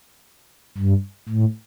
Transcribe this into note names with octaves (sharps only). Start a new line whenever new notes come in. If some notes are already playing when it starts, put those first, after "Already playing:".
G2
A2